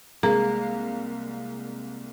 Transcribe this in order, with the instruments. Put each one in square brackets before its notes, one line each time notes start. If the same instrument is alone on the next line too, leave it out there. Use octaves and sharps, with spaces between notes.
[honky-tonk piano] C2 G#3 F5 [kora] A#3 [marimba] G#4